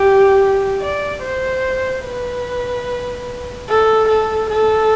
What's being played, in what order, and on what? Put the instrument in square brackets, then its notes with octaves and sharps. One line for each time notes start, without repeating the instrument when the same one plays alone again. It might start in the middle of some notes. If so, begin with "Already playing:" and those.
Already playing: [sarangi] G4
D5
C5
B4
A4
A4
A4